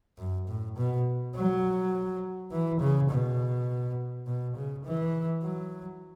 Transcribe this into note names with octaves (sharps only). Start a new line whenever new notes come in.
F#2
A2
B2
F#3
E3
C#3
B2
B2
C#3
E3
F#3